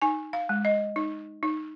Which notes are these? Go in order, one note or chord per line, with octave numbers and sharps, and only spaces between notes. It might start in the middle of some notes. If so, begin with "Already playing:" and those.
D#4 G#5
F5
G#3
D#5
D#4
D#4